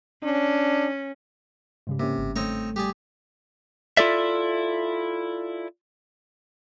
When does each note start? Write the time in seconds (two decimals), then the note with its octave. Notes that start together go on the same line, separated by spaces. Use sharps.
0.23 C#4 D4
1.87 G#2 C#3 G3
2.00 C3 A#3 C#4
2.18 G1
2.36 A3 C4 D#4 C#5
2.76 G3 G4 G#4 D5
3.97 E4 F4 A4 D5 E5